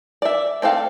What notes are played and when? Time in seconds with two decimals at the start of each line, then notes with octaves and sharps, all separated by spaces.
0.22 D5 E5
0.62 A3 C4 A4 F5